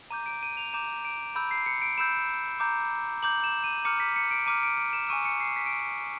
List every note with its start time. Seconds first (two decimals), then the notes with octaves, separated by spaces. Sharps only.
0.11 A#5 D6 G6 D#7
0.26 D7
0.43 D#7
0.57 F7
0.73 A#5 D6 G6 E7
1.05 D7
1.36 B5 E6 G6
1.51 C7
1.66 C#7
1.82 D7
1.98 B5 E6 G6 E7
2.60 A#5 D6 G6
3.23 A#5 D6 G6 F#7
3.44 E7
3.64 D#7
3.85 A#5 D6 F6 C#7
4.00 B6
4.16 C#7
4.31 D7
4.46 A#5 D6 F6 D#7
4.63 D7
4.78 D7
4.93 E7
5.09 G#5 C#6 E6 D#7
5.25 C#7
5.40 C7
5.56 B6
5.66 D7